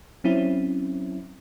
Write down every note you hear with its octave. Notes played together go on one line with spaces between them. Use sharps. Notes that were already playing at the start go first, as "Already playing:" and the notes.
F#3 C4 C#4 E4